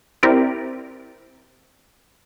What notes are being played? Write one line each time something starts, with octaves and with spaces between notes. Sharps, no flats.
C4 E4 G4 A#4 C5 D5